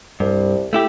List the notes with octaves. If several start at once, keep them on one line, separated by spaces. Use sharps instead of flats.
C2 G2
A3 E4 G4